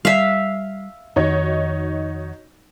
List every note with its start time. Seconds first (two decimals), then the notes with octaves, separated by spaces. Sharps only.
0.05 G3 E5 F5
1.16 F2 D#3 D#4 F#4 C#5